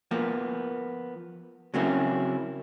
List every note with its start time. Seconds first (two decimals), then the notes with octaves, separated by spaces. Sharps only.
0.11 F3 A#3 B3
1.74 C#3 F#3 A#3 C4 C#4 E4